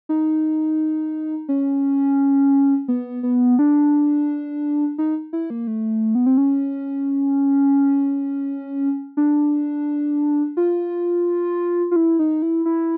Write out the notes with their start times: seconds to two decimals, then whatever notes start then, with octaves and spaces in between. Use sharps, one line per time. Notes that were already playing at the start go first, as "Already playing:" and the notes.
0.09 D#4
1.49 C#4
2.88 B3
3.23 B3
3.59 D4
4.98 D#4
5.33 E4
5.50 A#3
5.67 A3
6.15 B3
6.26 C4
6.37 C#4
9.17 D4
10.57 F4
11.91 F4
11.96 E4
12.19 D#4
12.42 E4
12.66 E4